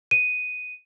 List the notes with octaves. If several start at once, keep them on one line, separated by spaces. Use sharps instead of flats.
D#7